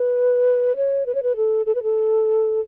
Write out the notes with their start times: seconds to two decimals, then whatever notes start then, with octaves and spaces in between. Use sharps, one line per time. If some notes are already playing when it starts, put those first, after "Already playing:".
Already playing: B4
0.76 C#5
1.06 B4
1.15 C#5
1.23 B4
1.36 A4
1.66 A4
1.75 B4
1.83 A4